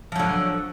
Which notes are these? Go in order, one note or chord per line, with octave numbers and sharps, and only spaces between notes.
D3 F3 F#3